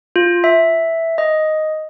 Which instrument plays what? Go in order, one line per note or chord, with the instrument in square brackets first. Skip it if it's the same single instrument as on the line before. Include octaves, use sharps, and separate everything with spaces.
[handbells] F4
E5
D#5